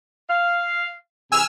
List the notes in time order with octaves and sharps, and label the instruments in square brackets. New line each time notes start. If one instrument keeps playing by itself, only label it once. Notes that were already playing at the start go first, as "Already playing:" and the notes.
[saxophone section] F5
[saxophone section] C3 E3 G#4 [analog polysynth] G#5 E6 F6